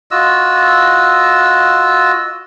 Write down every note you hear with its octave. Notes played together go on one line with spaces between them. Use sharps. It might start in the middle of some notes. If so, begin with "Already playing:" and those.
F4 F#4 D#5 E6